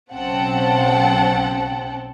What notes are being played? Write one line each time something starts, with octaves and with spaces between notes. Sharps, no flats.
B1 C#3 C4 F#5 G5 A5